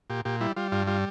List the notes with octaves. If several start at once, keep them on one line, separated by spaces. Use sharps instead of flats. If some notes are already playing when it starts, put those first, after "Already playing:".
A#2 G4
A#2 G4
G3 E4
G3 F4
G2 F4
G3 F4